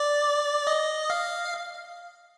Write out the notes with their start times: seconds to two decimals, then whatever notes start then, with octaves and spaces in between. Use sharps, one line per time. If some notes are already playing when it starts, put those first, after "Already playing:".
Already playing: D5
0.67 D#5
1.10 F5